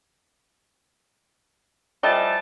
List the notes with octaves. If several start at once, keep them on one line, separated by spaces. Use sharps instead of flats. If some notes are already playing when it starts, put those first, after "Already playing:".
E3 F3 G3 A3 D#5 A5